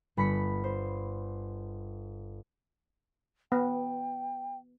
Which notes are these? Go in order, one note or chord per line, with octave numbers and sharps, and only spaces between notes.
G1 B5 B6 C#7
C5
B3 G5